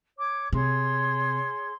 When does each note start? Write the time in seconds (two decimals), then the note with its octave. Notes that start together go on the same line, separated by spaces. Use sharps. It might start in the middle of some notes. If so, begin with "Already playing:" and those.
0.17 C#5 D6
0.53 C3 G#4 C#5 C6